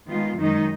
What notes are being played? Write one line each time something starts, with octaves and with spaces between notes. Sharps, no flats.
D#3 G#3 B3 F4
F#2 D#3 G#3 D#4